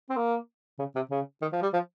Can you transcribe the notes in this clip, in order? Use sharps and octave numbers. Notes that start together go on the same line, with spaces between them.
C4
A#3
C#3
C3
C#3
D#3
F3
G3
F3